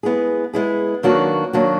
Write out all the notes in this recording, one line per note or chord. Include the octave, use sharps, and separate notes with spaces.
G#3 B3 E4 G#4
G#3 B3 E4 G#4
D#3 F#3 A#3 D4 F#4
D#3 F#3 A#3 D4 F#4